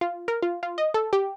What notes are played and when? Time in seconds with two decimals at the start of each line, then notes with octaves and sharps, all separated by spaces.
0.01 F4
0.28 A#4
0.43 F4
0.63 F4
0.78 D#5
0.94 A4
1.13 G4